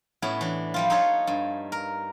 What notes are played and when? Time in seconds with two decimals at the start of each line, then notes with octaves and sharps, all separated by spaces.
0.22 A2 B3 C#4 E4
0.41 E3 D4
0.74 F3 G3 F4
0.90 D#4 F4 A4 C#5
1.27 G2
1.72 A#4